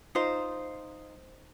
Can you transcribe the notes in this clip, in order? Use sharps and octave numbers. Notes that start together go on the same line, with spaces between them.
D#4 F4 C5